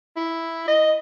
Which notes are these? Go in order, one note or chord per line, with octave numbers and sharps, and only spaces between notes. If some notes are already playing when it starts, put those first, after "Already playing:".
E4
D#5